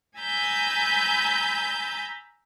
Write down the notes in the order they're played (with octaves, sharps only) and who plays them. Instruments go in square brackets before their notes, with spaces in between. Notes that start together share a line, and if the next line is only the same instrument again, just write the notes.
[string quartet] G#5 A#5 B5 E6 G6 A6